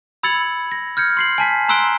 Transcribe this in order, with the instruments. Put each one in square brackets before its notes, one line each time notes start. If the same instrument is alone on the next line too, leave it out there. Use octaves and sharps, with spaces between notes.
[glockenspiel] B5 E6 G#6 A6 C#7 F#7
A#6
F6 G6 G#6 C#7
C6 C7 F#7
G#5 A5 B6
A#5 C6 E6 F#6 D7 G7